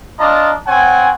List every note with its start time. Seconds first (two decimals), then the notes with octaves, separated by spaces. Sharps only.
0.19 D4 F4 D#5 A5 A#5
0.67 C4 C#5 F#5 G#5